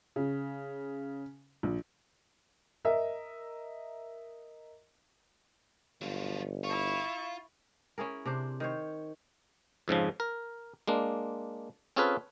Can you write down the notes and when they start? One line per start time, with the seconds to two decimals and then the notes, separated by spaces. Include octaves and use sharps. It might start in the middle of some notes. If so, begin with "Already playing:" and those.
0.16 C#3
1.63 A#1
2.85 A#4 D#5 E5
6.01 G1 F#3 F4
6.64 E4 F4 C#6
7.98 C#4 E4 G#4 A#4
8.26 C3 D4 C5
8.60 D#3 C5 C#5
9.88 F2 G#2 C#3 F3
10.20 A#4
10.88 G#3 A#3 D4
11.96 C4 C#4 F4 G#4 A4 B4